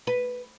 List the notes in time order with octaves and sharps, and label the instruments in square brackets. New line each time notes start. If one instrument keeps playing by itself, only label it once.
[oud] B4